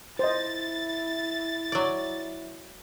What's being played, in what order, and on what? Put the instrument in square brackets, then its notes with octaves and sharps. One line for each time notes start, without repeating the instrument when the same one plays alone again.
[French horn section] E4 [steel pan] C5 D#5 [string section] A6
[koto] F#3 D5